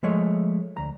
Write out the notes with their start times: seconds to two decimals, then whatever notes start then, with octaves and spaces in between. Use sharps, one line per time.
0.03 F3 G#3 A3 C#5 D#5
0.77 D2 A#5